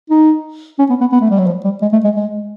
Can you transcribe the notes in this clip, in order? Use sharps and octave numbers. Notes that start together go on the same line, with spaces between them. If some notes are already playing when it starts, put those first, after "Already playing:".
D#4
C#4
B3
B3
B3
A3
G3
F#3
F3
G3
G#3
A3
G#3
G#3